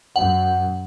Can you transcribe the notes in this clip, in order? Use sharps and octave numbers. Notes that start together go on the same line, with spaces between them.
F#2 F#5